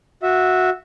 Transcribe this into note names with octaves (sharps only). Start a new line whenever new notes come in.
F#4 E5